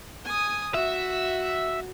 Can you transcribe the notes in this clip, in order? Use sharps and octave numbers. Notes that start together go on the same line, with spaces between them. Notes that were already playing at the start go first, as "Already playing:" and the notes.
G#5 D#6
F#4 E5